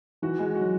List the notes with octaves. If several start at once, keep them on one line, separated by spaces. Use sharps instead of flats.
E3 F#4
G#3
F#3 F#4